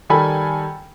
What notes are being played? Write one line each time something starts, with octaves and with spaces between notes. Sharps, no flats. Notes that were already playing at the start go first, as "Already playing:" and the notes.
D#3 G3 A4 G#5 B5